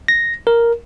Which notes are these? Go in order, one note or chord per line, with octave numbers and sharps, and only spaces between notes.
A#6
A#4